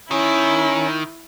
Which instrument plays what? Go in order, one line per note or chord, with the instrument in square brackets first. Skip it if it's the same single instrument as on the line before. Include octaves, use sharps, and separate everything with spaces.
[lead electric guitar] D#3 [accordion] C#4 [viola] E4